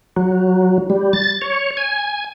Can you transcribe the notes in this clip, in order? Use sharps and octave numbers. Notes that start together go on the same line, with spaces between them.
F#3
G3
A6
C#5
G#5